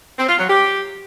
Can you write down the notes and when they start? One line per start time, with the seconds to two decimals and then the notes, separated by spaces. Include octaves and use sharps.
0.19 C4
0.29 F4
0.38 F#3
0.48 G4